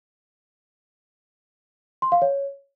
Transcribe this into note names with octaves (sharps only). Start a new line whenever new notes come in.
C6
F5
C#5